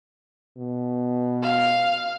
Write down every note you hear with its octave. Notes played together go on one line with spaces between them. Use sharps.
B2
F5